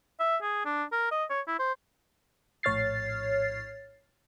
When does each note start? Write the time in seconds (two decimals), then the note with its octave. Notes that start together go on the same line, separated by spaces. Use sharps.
0.20 E5
0.42 G#4
0.66 D4
0.92 A#4
1.11 D#5
1.30 C#5
1.48 E4
1.59 C5
2.63 A#1 A2 C#5 F6 A6 C7